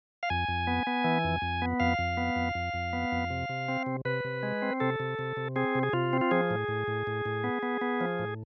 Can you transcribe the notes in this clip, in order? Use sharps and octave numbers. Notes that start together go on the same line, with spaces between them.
F5
F2 G#5
F2
B3
B3
E3
F2
F2
B3
F2 F5
F2
B3
F2
F2
F2
B3
F2
C3
C3
C4
C3
C3 B4
C3
G#3
C4
C3 A4
C3
C3
C3
C4 G#4
C3
G#4
C3 F4
C4
F4
F3 G#4
A2
A2
A2
A2
A2
B3
B3
B3
F3
A2